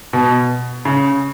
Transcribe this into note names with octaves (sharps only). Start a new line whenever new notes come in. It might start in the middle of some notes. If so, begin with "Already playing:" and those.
B2
C#3